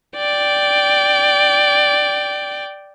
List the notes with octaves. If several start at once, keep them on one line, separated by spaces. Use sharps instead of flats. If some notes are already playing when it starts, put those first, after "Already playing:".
D5 G5